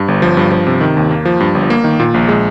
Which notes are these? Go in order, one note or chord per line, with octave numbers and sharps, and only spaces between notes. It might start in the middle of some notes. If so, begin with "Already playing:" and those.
Already playing: G2
G1
F3
G2
F3
C3
D#3
D#2
A#3
F3
G2
G1
A#3
D#3
A#2
A#1
G#3